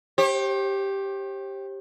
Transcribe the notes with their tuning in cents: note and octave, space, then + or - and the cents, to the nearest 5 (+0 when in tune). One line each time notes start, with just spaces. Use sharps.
G4 +0 C5 +45